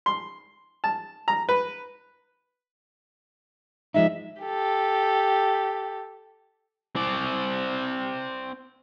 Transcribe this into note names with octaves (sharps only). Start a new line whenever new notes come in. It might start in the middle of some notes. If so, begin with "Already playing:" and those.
C6
A5
A#5
B4
F3 G#3 D#4 E5
G4 A4
C4 D5